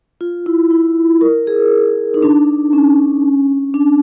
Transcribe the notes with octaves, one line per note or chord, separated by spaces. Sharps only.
F4
E4
E4
A#4
G#4
D#4
D4
C#4
D4